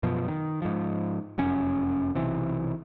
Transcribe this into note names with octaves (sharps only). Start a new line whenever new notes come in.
F#2 B2 F3
D#3
G#2 F3
F1 F#2 C#4
B1 C3 E3